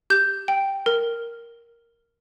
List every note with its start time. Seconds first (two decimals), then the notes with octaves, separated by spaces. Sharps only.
0.10 G4 G6
0.48 G5
0.86 A#4